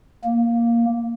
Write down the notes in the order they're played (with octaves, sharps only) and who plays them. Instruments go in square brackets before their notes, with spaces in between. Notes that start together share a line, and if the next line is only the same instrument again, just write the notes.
[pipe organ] A#3